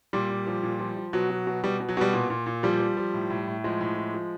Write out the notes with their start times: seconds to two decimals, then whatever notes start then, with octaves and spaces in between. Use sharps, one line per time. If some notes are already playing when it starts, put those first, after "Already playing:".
0.13 A#2 G3
0.30 A#2
0.47 F3
0.63 A#2
0.79 F3
0.97 F3
1.13 B2 F#3
1.30 B2
1.47 B2
1.64 B2 G3
1.80 B2
1.89 F#3
1.97 B2 G3
2.14 A#2
2.30 A#2
2.46 A#2
2.63 F3 G3
2.80 F3
2.97 F3
3.14 A2
3.30 A2
3.47 A2
3.64 F3 G#3
3.81 A2
3.98 F3
4.14 F3